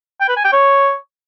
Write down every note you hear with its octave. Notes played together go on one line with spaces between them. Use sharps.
G5
B4
G#5
G5
C#5